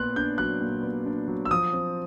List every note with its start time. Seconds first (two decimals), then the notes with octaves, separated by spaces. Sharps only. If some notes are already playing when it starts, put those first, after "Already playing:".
Already playing: A#2 B3 C6 F#6
0.16 D4 G6
0.38 F#3 F#6
0.61 A#2
0.83 B3
1.06 D4
1.28 F#3
1.45 E6
1.51 F3 D#6
1.73 C4